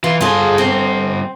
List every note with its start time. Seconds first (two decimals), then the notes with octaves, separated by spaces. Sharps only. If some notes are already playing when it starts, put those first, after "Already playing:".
0.04 E3 F4 B4
0.21 G2 F4 G#4 A4
0.58 C4